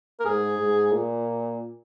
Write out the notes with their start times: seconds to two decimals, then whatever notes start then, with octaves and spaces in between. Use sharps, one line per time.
0.20 A#4
0.25 G#2 G#4
0.59 G#2
0.92 A#2